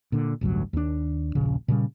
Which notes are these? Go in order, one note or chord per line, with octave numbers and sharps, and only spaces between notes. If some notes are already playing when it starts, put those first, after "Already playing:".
A#2 D3
A1 D2 G2 F#3
D#2 D4
D#1 A#1 C#3
A#2 C#3 G3